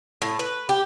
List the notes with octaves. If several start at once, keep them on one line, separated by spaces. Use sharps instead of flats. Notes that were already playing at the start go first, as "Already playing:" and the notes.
A2
B4
G4